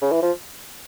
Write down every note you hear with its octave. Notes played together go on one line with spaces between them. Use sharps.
C#3
E3
F3